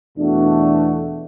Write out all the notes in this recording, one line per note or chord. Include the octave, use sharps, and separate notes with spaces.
E2 B2 A3 D4 F#4